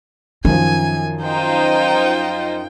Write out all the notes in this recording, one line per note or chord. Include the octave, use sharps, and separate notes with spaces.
F#2 D#3 F3 G#5
D#4 F4 C5 G5